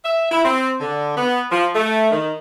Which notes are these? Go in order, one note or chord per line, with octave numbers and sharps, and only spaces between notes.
E5
E4
C4
D3
B3
F3
A3
D#3